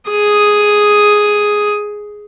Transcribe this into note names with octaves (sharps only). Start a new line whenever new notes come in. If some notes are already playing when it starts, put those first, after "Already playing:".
G#4 D#6